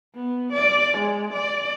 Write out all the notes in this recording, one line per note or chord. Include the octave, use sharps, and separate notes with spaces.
B3
D5
G#3
D5